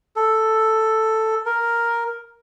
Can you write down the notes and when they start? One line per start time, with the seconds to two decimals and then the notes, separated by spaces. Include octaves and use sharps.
0.16 A4
1.46 A#4